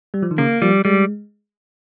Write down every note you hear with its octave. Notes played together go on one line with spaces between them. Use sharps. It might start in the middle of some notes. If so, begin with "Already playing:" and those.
G3
F3
D#3
C#3 A#3
F3 G3
G3 G#3